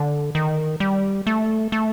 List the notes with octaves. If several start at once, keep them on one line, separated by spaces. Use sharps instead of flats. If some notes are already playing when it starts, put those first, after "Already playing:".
Already playing: D3
D#3
G3
A3
A3